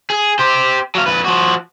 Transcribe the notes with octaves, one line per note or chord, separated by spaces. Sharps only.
G#4
G4 C5
F#3 F5
F2 B4
F3 F#4